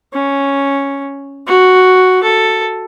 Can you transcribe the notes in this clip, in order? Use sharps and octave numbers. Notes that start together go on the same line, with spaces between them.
C#4
F#4
A4